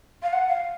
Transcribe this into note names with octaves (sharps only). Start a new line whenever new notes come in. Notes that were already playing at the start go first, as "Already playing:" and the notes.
F5
F#5
F5